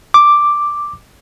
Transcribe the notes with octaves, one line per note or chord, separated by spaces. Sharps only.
D6